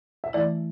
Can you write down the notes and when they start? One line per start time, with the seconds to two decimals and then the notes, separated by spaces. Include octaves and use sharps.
0.24 E5
0.33 E3 A3 E4 D5